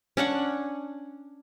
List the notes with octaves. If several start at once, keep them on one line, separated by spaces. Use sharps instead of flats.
C#4 D4 F#5 C#6